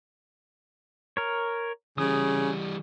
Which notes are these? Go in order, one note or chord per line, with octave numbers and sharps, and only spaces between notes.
A#4 C#5
C#3 E3 G3 D#6